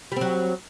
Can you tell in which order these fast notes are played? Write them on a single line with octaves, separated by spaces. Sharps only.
G3 C4 F#3